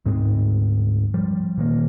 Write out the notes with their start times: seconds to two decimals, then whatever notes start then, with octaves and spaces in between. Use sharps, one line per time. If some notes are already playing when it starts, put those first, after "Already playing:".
0.06 D2 G#2 G#3 C4
1.14 F3 G3
1.57 A#2 D#3 A#3